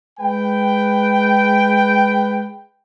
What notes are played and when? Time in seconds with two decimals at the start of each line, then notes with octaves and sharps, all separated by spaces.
0.20 G#3 B4 G5